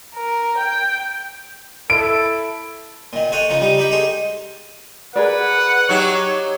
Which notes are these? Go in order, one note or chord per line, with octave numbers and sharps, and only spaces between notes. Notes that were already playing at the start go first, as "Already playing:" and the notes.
A#4
G5
E4 A4 D7
A#2 D#3
A4 C5 C#5 D#5 F#5
C#3 F3 D#4
G3 D#4
D#4 G4 B5 C#6
D#4 G#4 A4 C5
G#4 A#4 B4 D5 F#5
F#3 D#4 G4 C#5